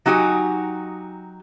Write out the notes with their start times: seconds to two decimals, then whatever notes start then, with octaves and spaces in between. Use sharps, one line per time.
0.06 F#3 D#4 F#4 G4 G#5